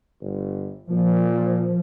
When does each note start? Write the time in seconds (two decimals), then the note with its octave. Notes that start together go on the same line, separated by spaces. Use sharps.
0.21 G1
0.90 A#2 F3